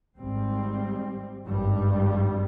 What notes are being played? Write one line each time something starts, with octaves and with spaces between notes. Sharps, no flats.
G#1 G#2 G3 C4
G#1 G2 G3